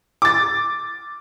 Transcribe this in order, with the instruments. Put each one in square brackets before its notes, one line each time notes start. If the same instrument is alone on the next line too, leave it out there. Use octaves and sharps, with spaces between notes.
[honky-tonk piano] D6 A6